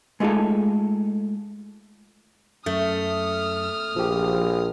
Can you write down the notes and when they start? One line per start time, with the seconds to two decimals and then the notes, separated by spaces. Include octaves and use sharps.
0.20 G#3 A3 D#4 F4 G#4 A4
2.66 F#2 A3 D#6 F6
3.96 A#1 F3 G4